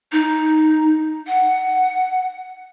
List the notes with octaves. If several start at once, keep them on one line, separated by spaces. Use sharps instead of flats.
D#4
F#5